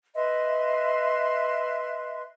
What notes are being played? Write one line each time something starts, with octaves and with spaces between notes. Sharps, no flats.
B4 D#5 E5 C6